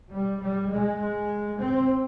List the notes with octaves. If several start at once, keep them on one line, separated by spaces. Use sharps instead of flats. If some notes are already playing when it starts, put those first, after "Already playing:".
G3
G3
G#3
C4